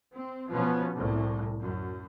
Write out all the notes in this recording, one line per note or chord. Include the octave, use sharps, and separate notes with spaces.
C4
B2 F3 B3 C#4
C2 A2
F#2